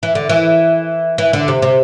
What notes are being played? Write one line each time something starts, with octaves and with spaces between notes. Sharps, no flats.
E3
D3
E3
E3
D3
C3
C3